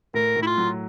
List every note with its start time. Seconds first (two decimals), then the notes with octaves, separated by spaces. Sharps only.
0.14 A2 A#4
0.36 A2
0.42 E4
0.47 F4
0.58 F#3